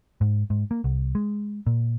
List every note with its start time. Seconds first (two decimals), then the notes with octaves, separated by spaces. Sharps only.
0.21 G#2
0.50 G#2
0.71 A#3
0.84 C2
1.15 G#3
1.67 A#2